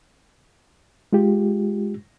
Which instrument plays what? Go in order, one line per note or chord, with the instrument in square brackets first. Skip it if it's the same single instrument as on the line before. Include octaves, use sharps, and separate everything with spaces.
[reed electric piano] G#3 F4 G4